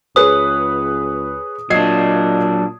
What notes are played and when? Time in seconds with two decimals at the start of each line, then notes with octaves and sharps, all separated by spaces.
0.16 C#2 G#4 B4 C#5 D#6
1.70 A#2 F#3 D4 D#5 G#6 C7